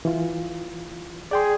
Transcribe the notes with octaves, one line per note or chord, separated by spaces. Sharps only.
E3 F4
G#4 D5 G5 C6